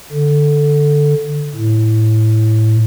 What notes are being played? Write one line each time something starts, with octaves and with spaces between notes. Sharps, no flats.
D3
A2